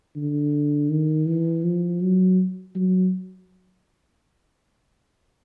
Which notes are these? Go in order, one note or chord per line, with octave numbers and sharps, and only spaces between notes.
D3
D#3
E3
F3
F#3
F#3